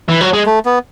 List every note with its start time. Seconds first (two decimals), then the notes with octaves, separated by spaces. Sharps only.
0.09 E3
0.21 F#3
0.33 G#3
0.46 A3
0.65 B3